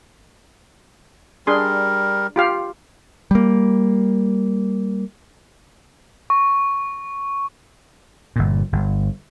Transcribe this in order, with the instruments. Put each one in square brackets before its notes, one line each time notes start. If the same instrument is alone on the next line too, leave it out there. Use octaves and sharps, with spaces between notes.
[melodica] G3 A#4 [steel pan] D4 G#4 C6
[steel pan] F4 G4 F5
[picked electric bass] G3 A#3
[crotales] C#6
[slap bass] G1 A#2
G1